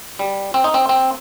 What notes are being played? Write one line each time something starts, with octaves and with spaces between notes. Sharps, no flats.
G3
C4
D#4
C4
C4